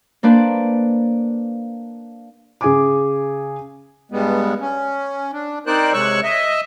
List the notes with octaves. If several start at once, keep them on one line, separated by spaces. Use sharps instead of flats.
A#3 D4 B4 C5 D5
C#3 G#4 G#5 D6
G2 G3 G#3 B3
C#4
D4
C4 D#4 A#4 C5 D5 F#6
C3 G#3 C#5 C#6 E6 F#6
D#5 E5